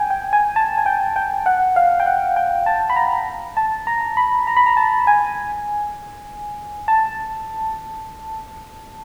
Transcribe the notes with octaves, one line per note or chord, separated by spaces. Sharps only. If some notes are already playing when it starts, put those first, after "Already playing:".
Already playing: G5 G#5
G5
G#5
A5
G#5
G5
G5
F#5
F5
G5
F#5
G5
A5
B5
A#5
A5
A#5
B5
A#5
B5
A#5
A5
G#5
A5